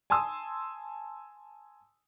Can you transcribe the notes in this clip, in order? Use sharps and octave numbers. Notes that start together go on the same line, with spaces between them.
G#5 A5 C6 D#6 E6